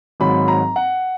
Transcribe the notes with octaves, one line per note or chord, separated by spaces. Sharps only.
G#1 G#2 F#3 B5
A#5
F#5